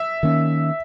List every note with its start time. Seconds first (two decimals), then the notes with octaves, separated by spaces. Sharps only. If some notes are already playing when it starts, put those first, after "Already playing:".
Already playing: E5
0.23 D#3 A#3 C#4